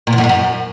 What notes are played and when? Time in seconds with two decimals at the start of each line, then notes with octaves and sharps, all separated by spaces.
0.07 A#2
0.13 E2
0.18 F#2
0.24 G#2
0.29 F#2